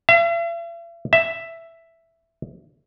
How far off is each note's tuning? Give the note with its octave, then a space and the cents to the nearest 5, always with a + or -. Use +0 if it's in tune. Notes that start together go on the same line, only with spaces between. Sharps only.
E5 +45
E5 +5